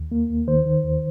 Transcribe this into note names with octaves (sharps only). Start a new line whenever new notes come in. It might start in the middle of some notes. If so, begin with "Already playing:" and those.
Already playing: D#2
A#3
D#2
D#3 C5
D#3
D#2